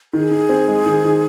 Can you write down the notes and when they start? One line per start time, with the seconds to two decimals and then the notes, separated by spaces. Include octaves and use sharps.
0.13 D#3 G#4
0.31 D#3
0.49 C4
0.68 G#3
0.86 D#3
1.04 D#3